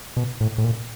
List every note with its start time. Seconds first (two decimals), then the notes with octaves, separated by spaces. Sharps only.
0.17 B2
0.41 A2
0.58 A2
0.64 A#2